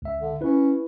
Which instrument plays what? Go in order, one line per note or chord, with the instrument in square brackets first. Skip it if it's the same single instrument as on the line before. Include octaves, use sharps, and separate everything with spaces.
[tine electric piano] C#2 E5
[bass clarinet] D3
[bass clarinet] C#4 [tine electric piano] E4 B4